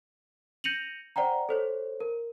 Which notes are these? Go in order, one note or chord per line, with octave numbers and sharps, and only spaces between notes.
G6 A#6 C#7 D#7 F7 F#7
C5 D5 F#5 G5 A#5
A4 C5 C#5
A#4